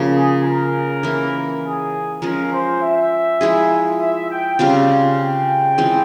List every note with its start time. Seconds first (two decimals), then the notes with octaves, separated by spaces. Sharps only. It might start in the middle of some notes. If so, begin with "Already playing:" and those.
Already playing: C#3 F3 A#3
0.14 G#4
0.43 A#4
1.03 E3 A#3 E4
1.63 G#4
2.22 F3 G#3 C#4 A#4
2.51 C5
2.81 E5
3.41 F3 G#3 E4 G#4
4.00 E5
4.30 G5
4.59 C#3 G3 C4 F4 F5
5.18 G5
5.78 E3 G#3 C4 F4